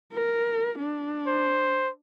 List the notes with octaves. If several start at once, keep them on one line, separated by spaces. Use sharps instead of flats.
A#4
D4
C5